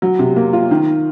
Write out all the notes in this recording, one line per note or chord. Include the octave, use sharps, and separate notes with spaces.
F#3
C3
A#3
F4
D#3